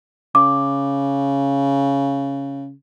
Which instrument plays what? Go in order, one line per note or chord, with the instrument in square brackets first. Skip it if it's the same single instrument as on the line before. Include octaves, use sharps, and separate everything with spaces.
[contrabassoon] C#3 [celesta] D6